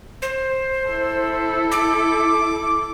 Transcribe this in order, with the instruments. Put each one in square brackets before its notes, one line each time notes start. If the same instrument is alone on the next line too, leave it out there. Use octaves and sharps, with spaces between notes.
[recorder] C5
[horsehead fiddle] E4 A4
[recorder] D6